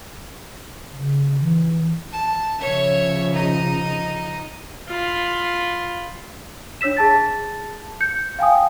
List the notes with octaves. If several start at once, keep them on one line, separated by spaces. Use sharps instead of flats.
C#3
E3
A5
C#3 F3 C#5 E5
D#4 D#5
F4 B5
D4 C#5 E6 B6 E7
G#4 A5 A6
G6 C#7
F5 G5 G#5 D#6